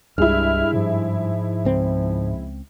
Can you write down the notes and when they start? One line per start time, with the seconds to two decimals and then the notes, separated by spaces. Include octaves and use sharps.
0.18 C2 G2 G#3 E4 F6
0.73 G#2 F3
1.65 C#2 C4